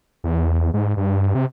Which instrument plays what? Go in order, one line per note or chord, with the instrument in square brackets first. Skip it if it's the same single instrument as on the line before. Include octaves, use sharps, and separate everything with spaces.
[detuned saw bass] E2
G#2
G2
C3